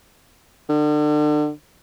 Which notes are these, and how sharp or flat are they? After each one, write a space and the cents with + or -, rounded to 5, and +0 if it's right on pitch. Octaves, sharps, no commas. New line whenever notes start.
D3 +35